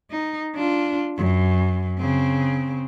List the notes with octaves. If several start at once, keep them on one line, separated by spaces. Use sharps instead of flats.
D#4
D4 F4
F#2
C#3 C4